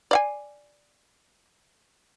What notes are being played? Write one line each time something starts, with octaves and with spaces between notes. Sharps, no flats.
D5 F5 G#5